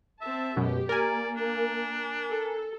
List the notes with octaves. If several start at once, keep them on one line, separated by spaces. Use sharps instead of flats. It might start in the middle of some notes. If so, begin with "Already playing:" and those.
C4 E5 A5
F#2 B2 G#3 G4
A#3 A#4 D5 G#5
D4
A4